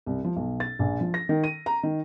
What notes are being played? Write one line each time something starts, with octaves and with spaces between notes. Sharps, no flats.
C2
F3
B1
A6
A#1
F3
A#6
D#3
D#7
A#5
D#3